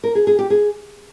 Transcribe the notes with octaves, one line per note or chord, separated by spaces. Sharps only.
A#4
G#4
G#4
G4
G#4